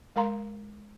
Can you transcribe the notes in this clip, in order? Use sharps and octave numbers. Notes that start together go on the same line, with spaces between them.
G#3 A#4 F5 A#5 C6